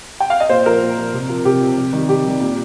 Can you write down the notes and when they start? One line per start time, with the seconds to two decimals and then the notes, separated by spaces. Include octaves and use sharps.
0.20 G5
0.30 F5
0.40 D#5
0.50 A#2 C5
0.66 F3 A#4
0.82 A#2
0.98 F3
1.14 C3
1.29 F3
1.45 C3 G4
1.61 F3
1.78 C3
1.93 D#3 G3
2.09 C3 G4
2.25 D#3 G3
2.41 A#2